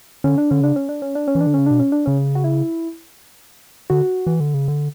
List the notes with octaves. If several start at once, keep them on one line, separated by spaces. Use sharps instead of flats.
D3 C#4
D4
D3 C#4
C#3 D4
C#4
D4
C#4
D4
C#4
E3
D4
D3
C#3 C#4
B2 D4
C#4
D4
C#3 C#4
F#4
E4
D3 F#4
E3
D3
C#3
D3